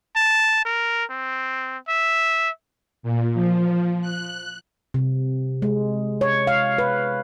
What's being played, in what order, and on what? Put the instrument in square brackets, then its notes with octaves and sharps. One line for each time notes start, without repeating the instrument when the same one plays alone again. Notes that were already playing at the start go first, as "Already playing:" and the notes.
[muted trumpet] A5
A#4
C4
E5
[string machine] A#2
F3
F#6
[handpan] C3
G#3
C#5
F5
B4